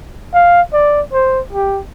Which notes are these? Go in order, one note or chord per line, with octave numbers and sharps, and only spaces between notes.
F5
D5
C5
G4